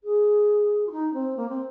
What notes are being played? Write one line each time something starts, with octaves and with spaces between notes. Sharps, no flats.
G#4
F4
D#4
C4
A#3
C4